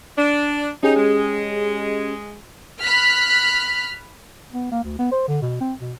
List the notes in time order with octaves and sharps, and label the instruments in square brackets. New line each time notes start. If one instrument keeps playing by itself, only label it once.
[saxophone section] D4
[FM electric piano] C#4 G4 G#4 [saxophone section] D#4
[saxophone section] G#3
[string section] B5 F6 F#6 B6
[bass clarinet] B3
A#3
D2
B3
C5
D3
B2
C4
B2